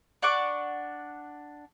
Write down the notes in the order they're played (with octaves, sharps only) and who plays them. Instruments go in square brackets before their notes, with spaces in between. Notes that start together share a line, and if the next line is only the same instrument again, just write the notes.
[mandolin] D4 F#5 C#6 D6